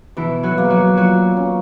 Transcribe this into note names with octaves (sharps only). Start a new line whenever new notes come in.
B2 E3 E4
F#3 F#4
A#3
F#3 F#4
A#2 F#3 F#4
C#4